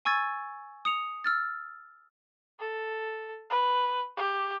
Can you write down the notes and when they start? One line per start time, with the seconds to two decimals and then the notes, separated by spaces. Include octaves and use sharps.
0.05 G#5 C#6 E6 G#6 A6
0.85 D#6 C#7 F7
1.24 E6 F6 A6
2.60 A4
3.50 B4
4.17 G4